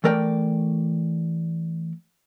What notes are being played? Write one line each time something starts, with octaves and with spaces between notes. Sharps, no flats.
E3 A3 A#4 D5 G5